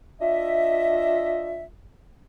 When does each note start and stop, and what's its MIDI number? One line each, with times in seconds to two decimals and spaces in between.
0.21 1.63 62
0.21 1.63 65
0.21 1.63 75
0.21 1.63 76